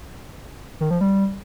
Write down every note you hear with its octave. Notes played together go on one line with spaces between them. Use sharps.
D#3
F3
G3